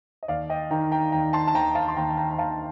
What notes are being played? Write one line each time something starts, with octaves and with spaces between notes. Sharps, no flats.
D#5
D#2 D5 F5
D#5 G5
D#3 G5 A#5
G5 A#5
D#2 G5 A#5
A5 C6
A5
D#2 G5 A#5
F5 A5
C6
D#2 G5 A#5
G5 A#5
A#5
D#2 F5 A5